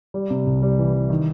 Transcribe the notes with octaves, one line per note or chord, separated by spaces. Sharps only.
G3
C3
C2
G3
E3
E3
D#3